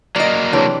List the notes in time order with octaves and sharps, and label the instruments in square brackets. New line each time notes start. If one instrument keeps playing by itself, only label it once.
[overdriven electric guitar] F#3 A#3 [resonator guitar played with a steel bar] D5 D#5
[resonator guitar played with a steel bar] C3 E3 D4 [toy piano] G#4 B4 C#5